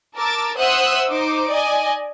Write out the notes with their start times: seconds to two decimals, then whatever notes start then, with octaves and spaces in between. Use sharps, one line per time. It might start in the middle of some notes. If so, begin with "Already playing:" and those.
0.16 A#4 A5 D6 E6 A6
0.57 C5 E5 F#5 D#6 E6 F#6
1.09 D#4 C5 D6
1.50 D5 D#5 G#5